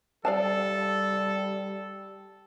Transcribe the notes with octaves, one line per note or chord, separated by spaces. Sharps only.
G3 A4 D5 F5 A5